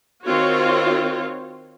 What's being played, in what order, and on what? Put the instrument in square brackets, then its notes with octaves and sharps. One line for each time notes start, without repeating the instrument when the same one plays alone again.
[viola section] D#3 C4 F4 F#4 C#5